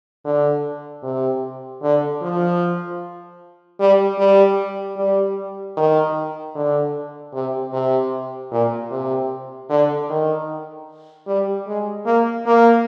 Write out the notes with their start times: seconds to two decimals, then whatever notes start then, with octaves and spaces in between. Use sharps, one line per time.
0.25 D3
1.04 C3
1.83 D3
2.22 F3
3.80 G3
4.18 G3
4.97 G3
5.77 D#3
6.55 D3
7.34 C3
7.73 C3
8.52 A#2
8.91 C3
9.70 D3
10.10 D#3
11.27 G3
11.67 G#3
12.06 A#3
12.46 A#3